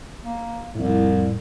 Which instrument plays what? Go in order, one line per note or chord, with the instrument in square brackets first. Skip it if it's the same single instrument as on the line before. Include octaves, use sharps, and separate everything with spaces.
[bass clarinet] A#3
[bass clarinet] C2 [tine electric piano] F2 A2